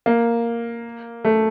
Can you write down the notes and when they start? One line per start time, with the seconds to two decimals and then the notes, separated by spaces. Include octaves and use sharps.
0.06 A#3
1.25 A3